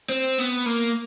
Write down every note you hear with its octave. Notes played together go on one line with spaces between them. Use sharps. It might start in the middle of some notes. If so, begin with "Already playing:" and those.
C4
B3
A#3